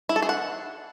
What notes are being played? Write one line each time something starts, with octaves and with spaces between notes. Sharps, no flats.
E4
A4
G#4
F#5